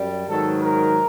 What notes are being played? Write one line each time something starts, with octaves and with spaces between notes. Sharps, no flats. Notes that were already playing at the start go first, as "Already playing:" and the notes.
Already playing: F#2 G3
G#2 D#3 F#3 A4
A#4